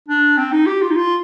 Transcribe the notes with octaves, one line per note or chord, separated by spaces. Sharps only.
D4
C4
D#4
G4
F4
D#4
F4